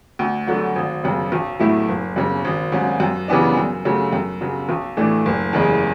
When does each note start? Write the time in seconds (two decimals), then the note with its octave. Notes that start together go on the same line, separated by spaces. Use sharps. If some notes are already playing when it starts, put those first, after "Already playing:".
0.19 D2
0.47 D3 F#3 A3
0.75 G#1
1.04 F#2 C#3
1.32 B1
1.59 A2 F#3 A3 E4
1.88 F#1
2.16 F#2 C#3
2.45 G#1
2.72 G#2 F#3 C#4
3.00 F#2
3.28 C#3 E3 B3 D4
3.57 F#2
3.85 C#3 F#3 A3
4.13 F#2
4.41 C#3 F#3
4.69 B1
4.97 A2 E3 A3 D4
5.26 F#1
5.53 E2 C#3 G#3